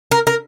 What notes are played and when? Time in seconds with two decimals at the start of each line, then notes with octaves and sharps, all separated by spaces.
0.11 A#4
0.27 A#4